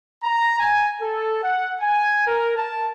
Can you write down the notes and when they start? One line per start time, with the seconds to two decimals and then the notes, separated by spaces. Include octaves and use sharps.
0.23 A#5
0.59 G#5
1.00 A4
1.43 F#5
1.81 G#5
2.26 A#4
2.56 A5